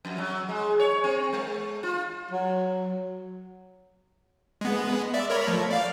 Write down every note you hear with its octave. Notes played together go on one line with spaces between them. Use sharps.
F2
F#3
G#3
C#5
C4
G#3
F4
F#3
G#3 B3
D5 E5
A#4 C#5 B5
F3 A3
D5 F5